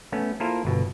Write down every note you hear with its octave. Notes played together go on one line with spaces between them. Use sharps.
A3 B3 C#4
A#3 E4 F4 A4 A#4 C5
G1 B2